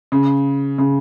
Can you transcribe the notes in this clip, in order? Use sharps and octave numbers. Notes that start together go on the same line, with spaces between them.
C#3
C#3